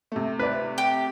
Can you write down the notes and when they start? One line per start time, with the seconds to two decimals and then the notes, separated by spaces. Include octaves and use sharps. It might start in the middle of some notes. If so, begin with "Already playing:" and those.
0.12 C3 A3
0.39 B4 D5
0.78 G4